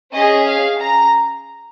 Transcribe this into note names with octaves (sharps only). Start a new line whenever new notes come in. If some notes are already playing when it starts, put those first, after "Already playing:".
C#4 G#4 D#5
F5
A#5